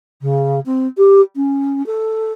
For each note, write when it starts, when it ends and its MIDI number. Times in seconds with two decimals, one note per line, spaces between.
0.22 0.60 49
0.66 0.87 60
0.97 1.21 67
1.36 1.85 61
1.86 2.32 69